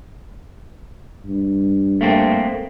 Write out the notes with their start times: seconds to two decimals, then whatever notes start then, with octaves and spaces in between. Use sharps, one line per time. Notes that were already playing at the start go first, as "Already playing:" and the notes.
1.25 G2
2.01 A3 A#3 C4